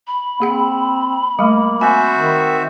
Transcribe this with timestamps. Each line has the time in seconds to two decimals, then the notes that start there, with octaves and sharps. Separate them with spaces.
0.07 B5
0.40 A#3 C4 G#4 F#5
1.39 G3 A3 A#3
1.81 C4 F#4 E5 G#5
2.16 D#3